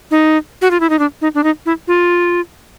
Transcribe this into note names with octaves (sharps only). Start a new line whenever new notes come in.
D#4
F#4
F4
E4
D#4
D4
D#4
D4
D#4
E4
F4